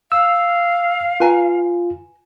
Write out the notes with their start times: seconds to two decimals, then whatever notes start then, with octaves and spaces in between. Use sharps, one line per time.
0.12 F5 E6
1.20 F4 B4 G#5 A#5